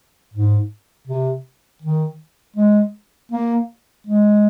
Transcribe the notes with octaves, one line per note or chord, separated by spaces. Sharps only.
G#2
C3
D#3
G#3
A#3
G#3